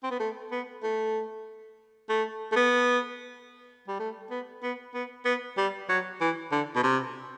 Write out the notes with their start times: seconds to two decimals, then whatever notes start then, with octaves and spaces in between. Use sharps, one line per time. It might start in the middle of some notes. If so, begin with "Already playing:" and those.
0.03 C4
0.11 B3
0.20 A3
0.51 B3
0.83 A3
2.09 A3
2.52 A3
2.56 B3
3.88 G3
4.00 A3
4.30 B3
4.63 B3
4.94 B3
5.25 B3
5.57 G3
5.89 F#3
6.21 E3
6.52 D3
6.76 B2
6.83 C3